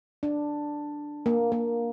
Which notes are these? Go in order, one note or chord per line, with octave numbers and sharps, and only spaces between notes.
D4
A#3
A#3